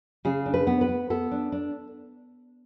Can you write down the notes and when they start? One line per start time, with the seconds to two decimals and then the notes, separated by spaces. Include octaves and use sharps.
0.25 C#3 G#4
0.46 D4
0.54 B4
0.67 B3
0.81 B4
0.89 B3
1.10 B3 A4
1.31 D4
1.52 D4